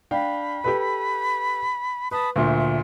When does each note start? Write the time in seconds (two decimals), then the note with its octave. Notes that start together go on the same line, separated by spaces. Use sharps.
0.11 D4 F5 G5 B5
0.64 G4 A4 B4
2.11 B4 A5 B5 D#6
2.36 D2 A#2 E5